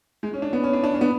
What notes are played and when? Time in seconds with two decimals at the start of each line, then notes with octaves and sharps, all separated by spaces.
0.23 G#3
0.33 C#4
0.42 D4
0.53 B3
0.64 C#4
0.73 D4
0.84 D4
0.94 C#4
1.01 B3